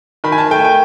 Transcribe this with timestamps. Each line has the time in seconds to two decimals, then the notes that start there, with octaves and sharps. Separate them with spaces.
0.24 D#3 B5
0.32 G#5
0.38 A5
0.51 A3 G5
0.65 G5